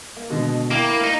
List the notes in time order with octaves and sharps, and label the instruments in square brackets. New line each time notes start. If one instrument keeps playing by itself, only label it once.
[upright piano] A#3
B2 D3 G#3
[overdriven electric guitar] A#3 [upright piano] E4 G5 B5
[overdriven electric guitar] D#4